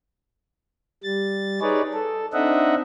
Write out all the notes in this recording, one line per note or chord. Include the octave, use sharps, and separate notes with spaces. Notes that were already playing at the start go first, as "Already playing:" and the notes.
G3 A6
D#4 G#4 B4 C#5 D5
A4
C4 D4 D#4 D#5 E5 F#5